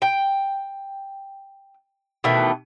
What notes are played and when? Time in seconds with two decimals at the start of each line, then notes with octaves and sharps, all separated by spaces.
0.02 G5
2.24 B2 D#3 E3 A3